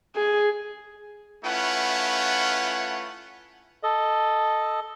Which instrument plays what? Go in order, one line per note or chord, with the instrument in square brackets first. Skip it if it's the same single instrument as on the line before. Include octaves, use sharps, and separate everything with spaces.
[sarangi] G#4
[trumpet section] A3 C#4 E4 F4 B4 F#5
[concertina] A4 D#5